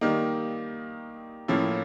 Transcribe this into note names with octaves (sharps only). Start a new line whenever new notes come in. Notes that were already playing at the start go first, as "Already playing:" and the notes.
D#3 G3 A#3 D#4
A2 F3 A#3 C#4 E4